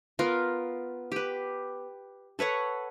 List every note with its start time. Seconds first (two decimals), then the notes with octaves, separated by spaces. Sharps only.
0.19 B3 F4 A#4
1.12 G4 B4
2.39 A4 B4 C#5 F#5